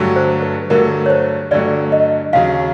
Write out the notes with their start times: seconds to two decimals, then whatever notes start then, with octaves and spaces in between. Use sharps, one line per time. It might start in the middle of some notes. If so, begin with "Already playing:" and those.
Already playing: G2 D3 F#3 A3
0.16 C5
0.42 B4
0.70 G2 D3 F#3 A3 A#4
1.06 C#5
1.10 C5
1.51 G2 D3 F#3 A3 D5
1.92 D#5
2.33 D#2 C#3 F#3 F5